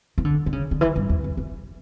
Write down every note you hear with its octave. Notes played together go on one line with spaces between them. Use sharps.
E3
D3
D3
C#3
D3
E3
G2
E2
F2
E2